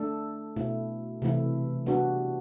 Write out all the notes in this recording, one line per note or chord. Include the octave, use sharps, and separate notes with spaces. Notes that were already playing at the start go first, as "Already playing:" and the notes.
Already playing: A3 D4 A4
B2 A3 E4
C3 E3 A3 E4
G3 B3 D4 F#4